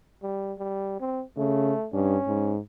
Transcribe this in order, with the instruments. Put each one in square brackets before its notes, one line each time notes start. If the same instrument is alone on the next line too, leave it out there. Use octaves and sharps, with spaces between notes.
[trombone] G3
G3
C4
[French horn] C#3 [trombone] A3
[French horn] G2 [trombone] C#4
[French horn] G#2